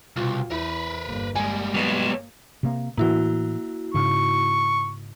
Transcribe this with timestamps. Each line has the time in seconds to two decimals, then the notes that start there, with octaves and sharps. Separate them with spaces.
0.16 C2 B2 F4
0.51 E2 E4 A#4 B4
1.06 G1 A#3
1.35 G3 G#3 A#3 G#5
1.75 F#3 B3
2.63 C3 A#3
2.97 A2 E3 A#3 E4 F#4
3.94 G#2 C#3 C#6